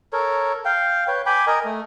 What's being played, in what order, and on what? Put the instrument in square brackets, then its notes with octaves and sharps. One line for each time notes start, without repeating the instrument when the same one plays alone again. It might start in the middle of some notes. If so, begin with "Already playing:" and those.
[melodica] A4 A#4 C#5
F5 G5
B4 C#5 G5
G5 G#5 B5 D6
A#4 D#5 G#5
A3